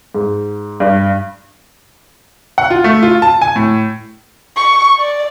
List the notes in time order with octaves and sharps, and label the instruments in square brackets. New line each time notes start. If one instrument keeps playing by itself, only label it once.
[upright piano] G#2
G2
[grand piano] F#5
F4
A3
F4
A5
G#5
A2
[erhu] C#6
D5